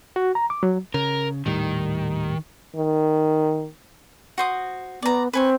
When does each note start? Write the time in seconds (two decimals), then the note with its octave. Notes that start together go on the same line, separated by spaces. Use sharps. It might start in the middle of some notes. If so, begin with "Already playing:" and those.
0.16 F#4
0.35 A#5
0.50 D6
0.63 F#3
0.94 C#3 A#4
1.46 D#1 A2 D#3 G3
2.76 D#3
4.38 F#4 C5 D#6
5.02 B3 D5 A#5
5.33 C4 B4 G#5 C#6